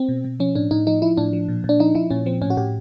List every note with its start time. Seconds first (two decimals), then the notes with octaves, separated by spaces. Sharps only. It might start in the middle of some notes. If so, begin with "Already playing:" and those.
Already playing: C4
0.09 B2
0.25 B2
0.40 F3 C#4
0.55 A2 D4
0.71 A2 D#4
0.87 F3 D#4
1.02 F3 E4
1.17 A2 D4
1.33 F3
1.49 A#2
1.64 A#2
1.69 D4
1.79 F3 D#4
1.95 F3 E4
2.10 A#2 C#4
2.26 F3 C4
2.41 A2 C#4
2.50 F#4
2.57 A2 G4